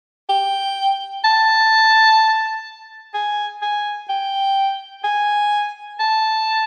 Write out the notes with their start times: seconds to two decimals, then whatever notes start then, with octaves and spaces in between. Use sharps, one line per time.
0.29 G5
1.24 A5
3.14 G#5
3.62 G#5
4.09 G5
5.04 G#5
6.00 A5